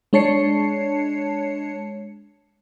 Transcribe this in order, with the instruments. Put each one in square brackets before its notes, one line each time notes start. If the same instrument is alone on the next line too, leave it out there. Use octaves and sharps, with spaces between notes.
[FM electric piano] G#3 D4 C#5 A5 C7 C#7